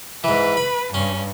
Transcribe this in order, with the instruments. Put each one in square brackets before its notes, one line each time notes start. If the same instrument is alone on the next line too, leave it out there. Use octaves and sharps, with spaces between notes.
[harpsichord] G#2 E3 [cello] B4
[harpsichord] B5
[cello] G2 [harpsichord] C#4